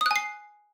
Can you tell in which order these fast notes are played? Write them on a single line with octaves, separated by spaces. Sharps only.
D#6 F#6 G#5 C7